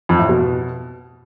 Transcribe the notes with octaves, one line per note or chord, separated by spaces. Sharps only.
F2
A2
B2